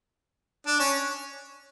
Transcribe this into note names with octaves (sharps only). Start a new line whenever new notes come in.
D4
C#4